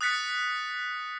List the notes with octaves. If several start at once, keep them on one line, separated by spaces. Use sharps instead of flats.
D#6 F#6 A6 B6 C#7